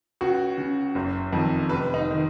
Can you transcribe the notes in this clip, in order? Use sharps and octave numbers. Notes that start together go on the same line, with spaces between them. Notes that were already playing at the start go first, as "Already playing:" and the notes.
C#2 F#4
C#3
F#1
F2 D#3
F1 B4
D#4
D#3